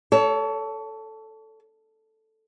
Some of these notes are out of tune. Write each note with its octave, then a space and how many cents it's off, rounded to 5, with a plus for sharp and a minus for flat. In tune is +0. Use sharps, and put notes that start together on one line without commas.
A4 +0 C#5 +35